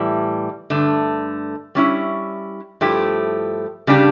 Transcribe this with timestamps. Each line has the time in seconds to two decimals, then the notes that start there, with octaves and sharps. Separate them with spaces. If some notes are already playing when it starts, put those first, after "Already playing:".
Already playing: A2 E3 G3
0.70 G2 D3 A3
1.75 G3 C#4 E4
2.81 G2 F3 A3 E4 G4
3.87 C#3 G3 D4 G4